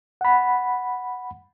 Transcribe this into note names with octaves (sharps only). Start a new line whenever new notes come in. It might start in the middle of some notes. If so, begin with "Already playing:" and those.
F#5 B5